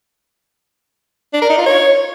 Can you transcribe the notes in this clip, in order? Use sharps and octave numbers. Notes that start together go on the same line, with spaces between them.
D4
A#4
D#4
F4
C#5